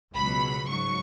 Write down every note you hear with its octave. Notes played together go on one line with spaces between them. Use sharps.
C#2 B2 F#3 B5
G#2 F#3 C#6